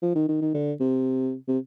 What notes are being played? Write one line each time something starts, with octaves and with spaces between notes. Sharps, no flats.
F3
D#3
D#3
D#3
D3
C3
C3